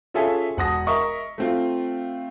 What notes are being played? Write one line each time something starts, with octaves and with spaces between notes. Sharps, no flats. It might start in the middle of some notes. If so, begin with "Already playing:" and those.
C#4 F4 G#4 A4 E5 G#5
E1 F#5 A5 D#6 A#6
A#4 D#5 E5 C#6
A3 C4 F4